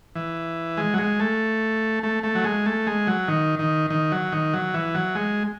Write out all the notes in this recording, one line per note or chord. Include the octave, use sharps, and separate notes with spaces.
E3
G#3
F#3
G#3
A3
A3
A3
F#3
G#3
A3
G#3
F#3
D#3
D#3
D#3
F#3
D#3
F#3
E3
F#3
G#3